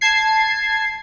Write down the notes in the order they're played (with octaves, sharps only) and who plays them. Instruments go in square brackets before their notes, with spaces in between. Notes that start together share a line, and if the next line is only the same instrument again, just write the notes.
[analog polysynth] A5 G#6 C7